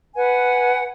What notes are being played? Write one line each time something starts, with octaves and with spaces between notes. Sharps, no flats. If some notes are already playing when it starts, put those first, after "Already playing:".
B4 F#5 G#5